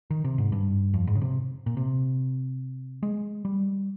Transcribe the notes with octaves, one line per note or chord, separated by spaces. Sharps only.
D#3
C3
G#2
G2
F2
G#2
C#3
C3
A#2
C3
G#3
G3